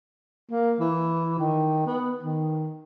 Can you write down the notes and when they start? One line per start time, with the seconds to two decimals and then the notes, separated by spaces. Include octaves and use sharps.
0.51 A#3
0.80 E3
1.38 D#3
1.86 B3
2.23 D#3